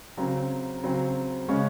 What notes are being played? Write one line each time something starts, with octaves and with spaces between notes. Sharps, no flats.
C#3 F#3 C4 A#5
C#3 F#3 C4
C#3 G#3 C#4 C#6